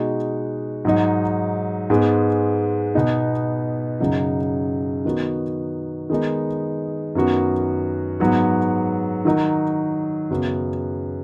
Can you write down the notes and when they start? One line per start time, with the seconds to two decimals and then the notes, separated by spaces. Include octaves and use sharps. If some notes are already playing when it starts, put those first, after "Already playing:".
Already playing: B2 G#3 D#4 F#4
0.85 G#2 F#3 D#4
1.90 G#2 G#3 B3
2.95 B2 B3 D#4
4.00 F#2 C#3 F#3 D#4
5.05 D#3 B3 D#4 F#4
6.10 D#3 G#3 B3 D#4
7.15 F#2 D#3 B3 F#4
8.20 G#2 F#3 B3 F#4
9.25 D#3 F#3 D#4
10.31 F#2 C#3 B3 F#4